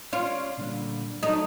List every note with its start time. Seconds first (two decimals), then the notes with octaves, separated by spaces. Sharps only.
0.13 C#4 F4 C#5 D5
0.58 A#2 D3 G3
1.23 F#3 A3 D4 D#4